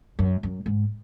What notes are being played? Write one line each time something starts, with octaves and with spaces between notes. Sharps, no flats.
F#2
F#2
G#2